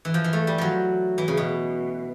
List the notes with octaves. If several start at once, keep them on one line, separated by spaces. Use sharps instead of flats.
E3
F3
E3
A3
G3
F3 F#3
E3
C#3
B2